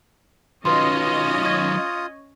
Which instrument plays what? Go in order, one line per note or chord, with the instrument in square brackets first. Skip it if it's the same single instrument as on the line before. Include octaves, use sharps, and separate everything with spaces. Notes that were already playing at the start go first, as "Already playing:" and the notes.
[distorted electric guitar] D#3 F#3 [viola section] C#4 D#5 [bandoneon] F4 D#6 [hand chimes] B4 C6
[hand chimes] C#6 G#6